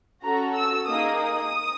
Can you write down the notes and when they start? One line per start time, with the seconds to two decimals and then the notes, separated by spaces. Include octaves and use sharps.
0.23 C#4 F#4 A4 A#5
0.55 E6
0.86 A#3 D#4 G#4 D#6
1.18 D#6